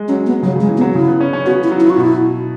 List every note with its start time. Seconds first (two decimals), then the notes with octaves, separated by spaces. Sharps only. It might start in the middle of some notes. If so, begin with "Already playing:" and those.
Already playing: G#3
0.08 F#3 C#4
0.26 B3
0.43 C#3 F#3
0.56 C#3 G#3
0.69 E3
0.77 B3
0.81 F#3
0.95 C#3 E4
1.07 B3
1.20 C#4
1.33 C#4
1.46 B3 F#4
1.63 E4
1.71 F#3
1.80 E4
1.90 F#4
1.97 B2 E4